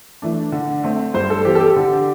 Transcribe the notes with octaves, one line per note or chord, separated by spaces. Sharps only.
E3 A3 D4
D3
A3 C4
G2 C5
A4
E3 B3 G4
A4
G4
D3